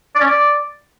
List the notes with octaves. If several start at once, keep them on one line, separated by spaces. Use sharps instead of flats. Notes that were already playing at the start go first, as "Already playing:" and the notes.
D5
C#4
D5